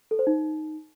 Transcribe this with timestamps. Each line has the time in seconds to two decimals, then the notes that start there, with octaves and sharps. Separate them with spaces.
0.11 A4
0.19 C5
0.27 D#4